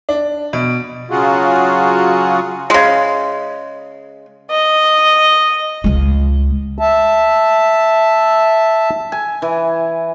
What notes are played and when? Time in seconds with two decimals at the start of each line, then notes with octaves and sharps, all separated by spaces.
0.09 D4
0.53 B2
1.11 C#3 F#3 F4 F#4 G#4
2.70 C#3 G#3
4.51 D#5
5.84 C#2 G#3
6.79 E5 A5
9.12 G#5
9.42 E3